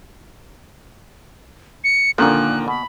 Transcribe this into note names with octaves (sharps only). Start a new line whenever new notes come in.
C#7
A#2 D3 D#3 F3 A#3 F#6
B2 B5